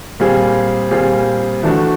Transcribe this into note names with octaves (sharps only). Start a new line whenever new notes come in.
A#2 G3 C4 F4 G#4
A#2 G3 C4 F4 G#4
E3 A3 D4 F#4